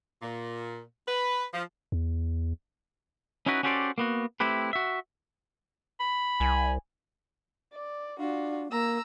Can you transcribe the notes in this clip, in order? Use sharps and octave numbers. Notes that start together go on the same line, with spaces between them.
A#2
B4
F3
E2
C#4 D#4 E4 F#4 B4
C#4 F#4 G4 A4 C5 D5
A#3 B3 F#4
A3 C4 E4 G4 B4
F#4 E5
B5
C2 G#5
D5
D4 F4 F#4
A#3 A#5 E6